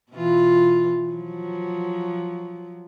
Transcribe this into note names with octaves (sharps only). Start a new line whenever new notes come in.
B2 E3 F4
F3 F#3